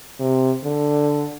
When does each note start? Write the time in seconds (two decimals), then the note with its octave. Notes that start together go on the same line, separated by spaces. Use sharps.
0.20 C3
0.64 D3